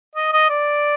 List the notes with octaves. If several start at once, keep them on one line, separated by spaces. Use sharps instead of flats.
D#5
D#5
D5